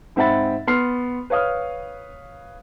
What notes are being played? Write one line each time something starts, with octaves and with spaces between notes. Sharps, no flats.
G#2 C4 E5 F#5 B5 A6
B3 C6 F6 C7
B4 C#5 F5 D#6 F6